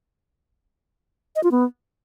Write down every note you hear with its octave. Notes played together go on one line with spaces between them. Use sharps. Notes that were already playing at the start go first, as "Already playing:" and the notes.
D#5
F4
B3